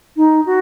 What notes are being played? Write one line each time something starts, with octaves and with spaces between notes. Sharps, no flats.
D#4
F#4